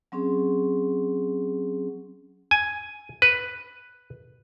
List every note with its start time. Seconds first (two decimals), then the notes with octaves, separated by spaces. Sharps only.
0.12 F#3 C4 C#4 G#4
2.51 G#5
3.22 B4